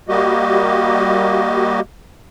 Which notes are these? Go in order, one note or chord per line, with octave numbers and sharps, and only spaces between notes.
G3 A#3 F#4 G4 D#5